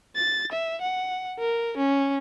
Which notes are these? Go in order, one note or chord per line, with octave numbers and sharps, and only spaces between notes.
A6
E5
F#5
A#4
C#4